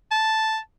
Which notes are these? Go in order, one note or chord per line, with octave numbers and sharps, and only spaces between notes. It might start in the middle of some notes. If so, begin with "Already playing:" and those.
A5